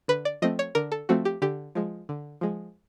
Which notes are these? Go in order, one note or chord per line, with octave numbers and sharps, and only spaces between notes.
D3 B4
D5
F3 A3 C4 D#5
C#5
D3 A#4
A4
F3 A3 C4 F#4
G4
D3 G4
F3 G#3
D3
F3 G#3